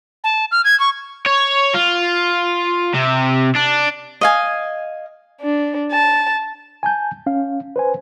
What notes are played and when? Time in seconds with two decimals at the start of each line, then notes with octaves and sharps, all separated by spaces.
0.24 A5
0.52 F6
0.64 G#6
0.80 C#6
1.26 C#5
1.75 F4
2.94 C3
3.55 D4
4.21 D#5 F5 G#5
5.41 D4
5.92 A5
6.83 G#5 A5 G6
7.26 C#4 F5
7.76 B4 C5 G#5